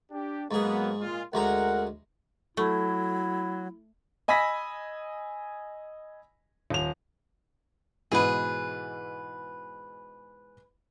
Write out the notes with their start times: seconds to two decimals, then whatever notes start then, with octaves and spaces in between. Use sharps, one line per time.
0.11 D4 G4
0.51 G#2 F#3 A#3 B3 G#4
1.00 A#2 G#3 F4
1.33 D2 G#3 A#4 F#5 A#5
2.57 F#3 A3 E4
4.28 D#5 G#5 B5 E6 A#6 B6
6.70 D#1 F7
8.12 G#2 B2 E3 G#4 B4